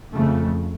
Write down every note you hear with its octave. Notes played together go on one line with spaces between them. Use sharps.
F2 C#3 A3